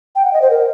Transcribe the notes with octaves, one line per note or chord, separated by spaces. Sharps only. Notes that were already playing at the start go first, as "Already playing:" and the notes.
G5
F#5
D#5
C5
A#4